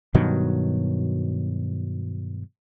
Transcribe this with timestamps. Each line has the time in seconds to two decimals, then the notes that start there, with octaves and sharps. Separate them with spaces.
0.14 G2 B2 D#3 F#3